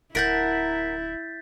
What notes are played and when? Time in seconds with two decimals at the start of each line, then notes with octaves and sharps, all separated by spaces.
0.15 D1 E4 A#4 F#5 A5 G6 A6 B6